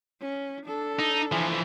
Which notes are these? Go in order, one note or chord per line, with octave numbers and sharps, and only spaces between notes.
C#4
D4 A4
D#4
E3 F3